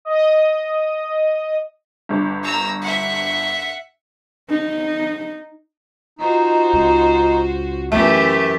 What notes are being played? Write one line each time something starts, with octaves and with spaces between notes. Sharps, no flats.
D#5 D#6
G1 G2
A#5 E6
E5 F#5
D#4
D#4 F4 F#4 C5
C#2
F#2 E3 A3 G4 E5 A5